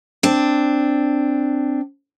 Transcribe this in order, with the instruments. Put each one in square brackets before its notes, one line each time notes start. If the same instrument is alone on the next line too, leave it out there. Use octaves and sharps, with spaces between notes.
[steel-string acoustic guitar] C4 D4